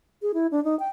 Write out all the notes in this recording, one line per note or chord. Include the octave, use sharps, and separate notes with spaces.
G#4
E4
D4
D#4
G5